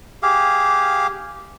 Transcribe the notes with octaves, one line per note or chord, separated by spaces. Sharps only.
G4 G#4 F5